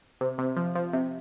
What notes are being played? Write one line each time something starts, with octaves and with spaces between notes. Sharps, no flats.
C3
C3
F3
F3
C3